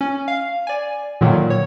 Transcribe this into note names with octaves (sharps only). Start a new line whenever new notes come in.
C#4
F5
D5 G#5
A#2 D3 D#3 F#3 A#3
C#5